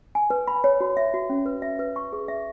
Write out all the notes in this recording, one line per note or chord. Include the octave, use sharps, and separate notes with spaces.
G#5
B4
B5
C#5
F#4
E5
F#4
C#4
B4
E5
B4
C#6
G#4
E5